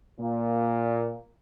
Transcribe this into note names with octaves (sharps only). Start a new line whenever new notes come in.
A#2